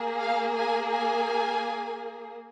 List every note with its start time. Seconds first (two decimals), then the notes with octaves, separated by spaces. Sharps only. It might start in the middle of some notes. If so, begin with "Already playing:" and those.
Already playing: A#3 G#4
0.19 F5
0.55 G#5
0.91 G#5